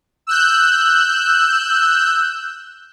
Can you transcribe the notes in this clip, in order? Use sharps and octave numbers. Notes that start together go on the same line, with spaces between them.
E6 F#6 G6